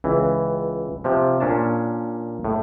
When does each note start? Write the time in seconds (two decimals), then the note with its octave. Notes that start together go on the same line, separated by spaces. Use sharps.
0.04 C#2 E3
1.04 C3 F3
1.40 A#2 C#4 D4 A5
2.45 A2